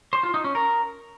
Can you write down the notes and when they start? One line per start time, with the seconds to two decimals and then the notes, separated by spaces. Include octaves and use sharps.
0.13 C5
0.23 F4
0.34 D#4
0.44 C#4
0.55 A#4